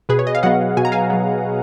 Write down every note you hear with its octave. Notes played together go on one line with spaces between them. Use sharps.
B2 G#4 B4
C#5
D#5
F5
F#3 B3 D#5 F#5
B2 G#5
A#5
F5 G#5
F#3 B3